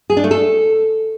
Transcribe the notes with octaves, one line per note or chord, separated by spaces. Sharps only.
G#4
D4
A3
A4